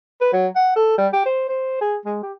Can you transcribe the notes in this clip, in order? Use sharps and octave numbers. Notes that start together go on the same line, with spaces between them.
B4
F#3
F#5
A4
G3
G4
C5
C5
G#4
G#3
G4